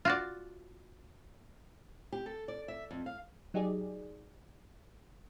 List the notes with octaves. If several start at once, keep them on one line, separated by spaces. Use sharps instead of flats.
F4 F#4 D5
G4
A4
D5
E5
F2
F5
F#3 D#4 G4 G#4 D5